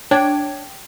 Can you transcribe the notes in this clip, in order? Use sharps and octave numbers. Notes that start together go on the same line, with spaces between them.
D4 C#5 G5 G#6